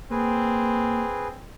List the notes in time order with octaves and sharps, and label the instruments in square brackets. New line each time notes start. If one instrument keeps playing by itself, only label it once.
[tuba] A#3 [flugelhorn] C4 [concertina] G#4 B4